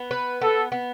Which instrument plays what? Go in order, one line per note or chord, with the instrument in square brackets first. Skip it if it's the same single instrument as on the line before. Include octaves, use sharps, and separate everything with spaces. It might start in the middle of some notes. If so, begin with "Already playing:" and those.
Already playing: [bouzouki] B3
B4
[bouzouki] B3 [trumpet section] A4
[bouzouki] B3